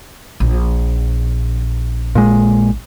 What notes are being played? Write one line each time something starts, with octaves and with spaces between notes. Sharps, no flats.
A#1
A#2 G#3